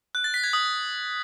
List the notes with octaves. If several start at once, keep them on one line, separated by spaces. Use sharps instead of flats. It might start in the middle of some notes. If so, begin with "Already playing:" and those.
F#6
A6
B6
G#6
D#6